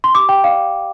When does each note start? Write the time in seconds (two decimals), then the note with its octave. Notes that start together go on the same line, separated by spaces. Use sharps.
0.04 C6
0.15 G4 D6
0.29 G4 G5
0.44 D5 F5